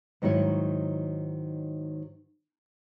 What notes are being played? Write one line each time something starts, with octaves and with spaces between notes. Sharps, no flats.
G#2 D#3 F#3 E4 C#5